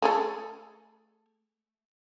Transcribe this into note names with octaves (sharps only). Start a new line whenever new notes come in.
A3 G#4 A4